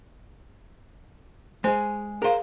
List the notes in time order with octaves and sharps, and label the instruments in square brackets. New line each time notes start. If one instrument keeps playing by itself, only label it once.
[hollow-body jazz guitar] G#3 G#4 [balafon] C5
[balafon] G#4 F5 [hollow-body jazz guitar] A#4 C5